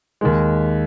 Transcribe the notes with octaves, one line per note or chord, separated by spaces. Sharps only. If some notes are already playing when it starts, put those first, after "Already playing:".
D#2 D#3 G#3